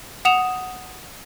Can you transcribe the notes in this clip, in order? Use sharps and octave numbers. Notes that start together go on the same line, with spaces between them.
F#5 D#6 E7 F7